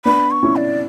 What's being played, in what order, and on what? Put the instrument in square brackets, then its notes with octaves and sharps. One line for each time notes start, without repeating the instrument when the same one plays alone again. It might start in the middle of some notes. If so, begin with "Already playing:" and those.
[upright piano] B3 D4 [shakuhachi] B5
[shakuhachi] C#6
[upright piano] C#4 E4
[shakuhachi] D5